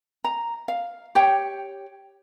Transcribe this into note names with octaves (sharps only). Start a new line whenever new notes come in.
A#5
F5
G4 C#5 G5